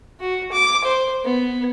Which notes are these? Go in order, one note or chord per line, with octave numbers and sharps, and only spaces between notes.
F#4
D6
C5
B3